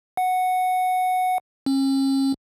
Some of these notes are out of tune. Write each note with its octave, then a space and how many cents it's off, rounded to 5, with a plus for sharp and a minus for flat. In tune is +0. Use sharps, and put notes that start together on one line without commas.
F#5 -5
C#4 -40